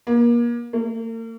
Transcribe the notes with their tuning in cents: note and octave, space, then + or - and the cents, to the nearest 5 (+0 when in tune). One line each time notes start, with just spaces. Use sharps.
A#3 +30
A#3 -45